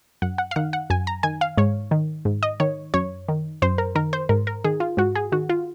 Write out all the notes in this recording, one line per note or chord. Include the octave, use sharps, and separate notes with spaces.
F#2 F#5
F#5
F5
D#3 F#5
F#5
F#2 G#5
A#5
D#3 G#5
F5
G#2 C#5
D#3
G#2
D#5
D#3 C#5
F#2 C#5
D#3
F#2 C5
A#4
D#3 A#4
C5
G#2 A#4
A#4
D#3 G#4
F4
G#2 F#4
G#4
D#3 F#4
F4